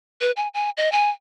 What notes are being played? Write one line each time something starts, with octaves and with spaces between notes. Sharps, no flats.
B4
G#5
G#5
D#5
G#5